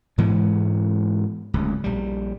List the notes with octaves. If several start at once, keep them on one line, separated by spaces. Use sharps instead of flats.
G#2 E3 G#3 B3
D1 C#2
A#1 G3